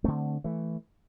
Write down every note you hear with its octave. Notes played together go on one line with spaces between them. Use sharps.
D3 A3 C4
E3 A3